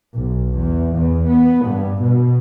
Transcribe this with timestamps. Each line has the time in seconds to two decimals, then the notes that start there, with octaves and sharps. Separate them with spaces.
0.15 B1
0.59 E2
0.97 E2
1.30 B3
1.66 G2
2.04 B2